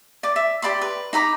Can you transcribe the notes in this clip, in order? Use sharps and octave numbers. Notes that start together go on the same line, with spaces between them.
D5 D6
E5
G4 D5 B5 C6
B4
D#4 A#5 B5 D6